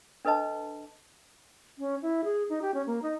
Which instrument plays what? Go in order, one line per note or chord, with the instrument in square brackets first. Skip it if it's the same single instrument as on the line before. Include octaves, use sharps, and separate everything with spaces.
[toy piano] D4 A4 B4 D#5 A5
[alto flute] C#4
E4
G#4
D#4
G4
C#4
A#3
D#4